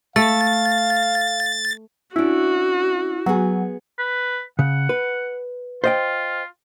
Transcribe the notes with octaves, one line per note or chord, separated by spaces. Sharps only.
A3 F5 A6
C#4 D4 E4 F#4
F#3 B3 G#4
B4
C#3 F#5
B4
F4 C5 D#5 G5